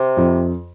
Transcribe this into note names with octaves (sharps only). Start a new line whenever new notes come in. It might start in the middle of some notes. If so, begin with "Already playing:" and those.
Already playing: C3
F2